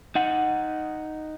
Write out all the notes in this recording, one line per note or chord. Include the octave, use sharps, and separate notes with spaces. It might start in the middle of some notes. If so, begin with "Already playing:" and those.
D#4 F#5